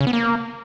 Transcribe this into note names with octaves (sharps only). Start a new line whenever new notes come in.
C#3
B3
A#3